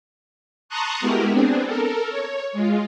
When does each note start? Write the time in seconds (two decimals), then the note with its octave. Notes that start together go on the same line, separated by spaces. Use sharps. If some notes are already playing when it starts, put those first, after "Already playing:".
0.69 A5 A#5 C6 C#6 D#6 F#6
1.00 G#3 B3 E4 F#4 G4 A#4
1.30 B3 C4 D4 G#4
1.64 A4 A#4
2.09 C#5
2.53 G#3 F4